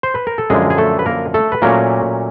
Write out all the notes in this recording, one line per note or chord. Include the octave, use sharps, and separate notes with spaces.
C5
B4
A#4
A4
F#2 D3 F3 G#3 G#4
G#4
A3 A4
B4
A#3 A#4
A3 A4
B4
A#2 F#3 A3 A#3 C#4 A#4